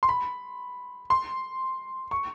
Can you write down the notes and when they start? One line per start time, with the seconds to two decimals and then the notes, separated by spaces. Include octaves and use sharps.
0.03 C6
0.09 B5
1.10 C6
2.11 C#6